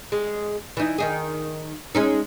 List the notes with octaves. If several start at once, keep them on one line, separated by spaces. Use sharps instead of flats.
G#3
E3 D#4
D#3 D#4 G#4
G#3 C#4 D#4